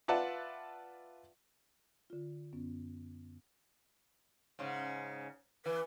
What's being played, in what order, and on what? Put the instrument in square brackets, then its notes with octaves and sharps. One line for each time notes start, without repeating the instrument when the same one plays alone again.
[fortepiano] F4 B4 D5 E5 F#5 A5
[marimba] D3 F4
F#2 B3 C#4
[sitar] G#2 C#3
[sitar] E3 [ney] B4